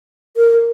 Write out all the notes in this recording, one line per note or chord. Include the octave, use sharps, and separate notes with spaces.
A#4